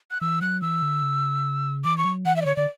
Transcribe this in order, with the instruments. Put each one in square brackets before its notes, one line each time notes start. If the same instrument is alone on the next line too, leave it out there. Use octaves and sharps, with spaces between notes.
[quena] F#6
[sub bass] E3 [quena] E6
[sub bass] F#3 [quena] F#6
[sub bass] E3 [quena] E6
[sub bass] D3
C#3
[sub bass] E3 [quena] D6
[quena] C#6
[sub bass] F#3
[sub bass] E3 [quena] F#5
[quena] E5
D5
[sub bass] D3 [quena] C#5
[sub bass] D3 [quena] D5